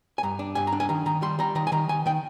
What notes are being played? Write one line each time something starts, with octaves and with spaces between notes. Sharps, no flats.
G#5
G2 A#5
D4
G2 G#5
A#5
D4
G#5
D#3 A#5
D#3 A#5
G3 C6
G3 A#5
D#3 A#5
G#5
D#3 A#5
D#3 G#5
D#3 G5